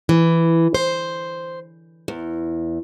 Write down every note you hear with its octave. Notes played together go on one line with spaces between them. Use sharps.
E3
C5
E2